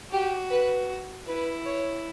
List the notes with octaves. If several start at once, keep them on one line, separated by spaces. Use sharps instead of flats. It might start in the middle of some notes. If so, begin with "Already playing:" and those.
F#4 G4
B4
E4 B4
C#5